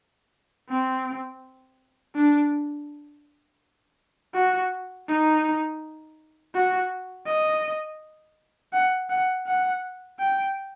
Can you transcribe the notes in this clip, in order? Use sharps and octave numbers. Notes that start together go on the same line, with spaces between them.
C4
D4
F#4
D#4
F#4
D#5
F#5
F#5
F#5
G5